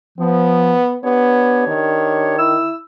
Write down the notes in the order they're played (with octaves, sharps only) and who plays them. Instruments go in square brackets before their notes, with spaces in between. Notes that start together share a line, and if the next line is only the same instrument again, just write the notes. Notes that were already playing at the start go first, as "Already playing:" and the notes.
[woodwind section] F3 [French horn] B3
[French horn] B3 [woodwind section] D4 G4 C#5
[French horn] D#3
[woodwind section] E4 E6